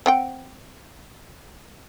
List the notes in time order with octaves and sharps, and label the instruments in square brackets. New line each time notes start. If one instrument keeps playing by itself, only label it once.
[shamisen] C4 F#5 G5